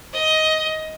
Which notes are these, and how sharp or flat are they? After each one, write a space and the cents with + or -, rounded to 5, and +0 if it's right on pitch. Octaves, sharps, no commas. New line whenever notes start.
D#5 +15